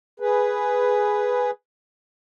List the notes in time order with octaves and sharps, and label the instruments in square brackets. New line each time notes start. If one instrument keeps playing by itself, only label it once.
[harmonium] G#4 B4